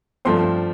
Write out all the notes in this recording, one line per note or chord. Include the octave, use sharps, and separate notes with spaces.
G2 F3 A3 C4 C6